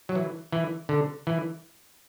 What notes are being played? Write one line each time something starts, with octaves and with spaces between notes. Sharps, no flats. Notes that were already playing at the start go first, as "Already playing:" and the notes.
F#3
E3
E3
D3
E3